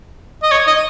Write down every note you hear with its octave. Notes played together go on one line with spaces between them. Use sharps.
D#5
C#5
D#5